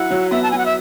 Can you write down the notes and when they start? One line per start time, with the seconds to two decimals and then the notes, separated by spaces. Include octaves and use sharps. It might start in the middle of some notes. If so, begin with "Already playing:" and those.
Already playing: F#3 E4 F#5
0.10 F#3
0.31 B3 E5
0.43 A5
0.51 F#3 G#5
0.58 F#5
0.66 E5